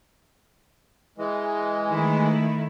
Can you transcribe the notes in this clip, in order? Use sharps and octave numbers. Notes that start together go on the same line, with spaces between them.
E3 G#3
D#3 A3 E4